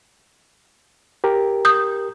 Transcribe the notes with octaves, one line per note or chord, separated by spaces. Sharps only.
G4 A#4
D#6 G6